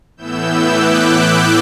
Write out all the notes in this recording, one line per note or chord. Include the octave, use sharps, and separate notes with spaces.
A2 E3 B3 E4 E6 G6
D6 F#6